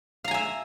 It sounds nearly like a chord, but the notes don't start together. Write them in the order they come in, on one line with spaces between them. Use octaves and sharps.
F5 A#5 G#5 E5